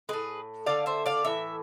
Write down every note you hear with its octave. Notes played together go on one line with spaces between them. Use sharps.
A2 G#3 G#4 B4
D3 A3 D5 F5
C5 E5
D5 F5
A2 E3 E5